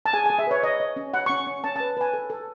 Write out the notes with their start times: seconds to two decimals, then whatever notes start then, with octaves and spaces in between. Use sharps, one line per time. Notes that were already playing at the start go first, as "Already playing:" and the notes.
0.06 A5
0.13 G#4 G#5
0.26 G#5
0.30 G#4
0.39 E5
0.47 B4 C#5
0.63 C#5 D#5
0.80 C#5
0.96 C#4
1.14 C#5 F#5
1.26 C#6
1.30 C#4
1.47 C#4
1.64 C#4 A5
1.76 A5
1.80 B4
1.97 B4 G#5
2.14 A4
2.30 A4